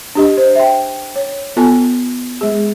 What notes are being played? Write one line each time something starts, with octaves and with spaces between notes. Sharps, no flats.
D4 G4 D#5
C5
E5 G5
C#5
B3 F4 A4 G#5 A5
G#3 G#4